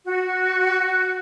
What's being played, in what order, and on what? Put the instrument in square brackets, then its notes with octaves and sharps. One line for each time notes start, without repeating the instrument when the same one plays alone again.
[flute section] F#4